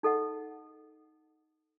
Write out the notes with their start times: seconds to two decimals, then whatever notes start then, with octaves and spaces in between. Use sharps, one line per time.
0.03 D#4 A4 D#5 F#5